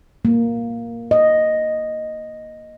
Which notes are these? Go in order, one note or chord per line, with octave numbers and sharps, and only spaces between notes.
A#3
D#5